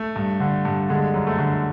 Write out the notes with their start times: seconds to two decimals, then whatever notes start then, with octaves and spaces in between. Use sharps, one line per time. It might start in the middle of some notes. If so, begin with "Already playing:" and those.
Already playing: A3
0.16 G2
0.40 D3
0.65 G2
0.89 D3 G#3
1.14 F#2
1.27 A3
1.39 D3